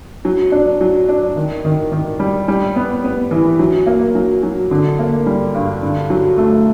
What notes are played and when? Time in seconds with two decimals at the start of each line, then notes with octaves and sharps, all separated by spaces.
0.25 F#3
0.52 D4
0.81 F#3
1.09 D4
1.36 D#3
1.65 D#3
1.92 D#3
2.20 G3
2.48 G3
2.76 B3
3.04 B3
3.31 E3
3.59 F#3
3.87 A#3
4.15 F#3
4.43 F#3
4.71 D3
4.99 A#3
5.26 G3
5.55 G2
5.83 D3
6.10 F#3
6.38 A3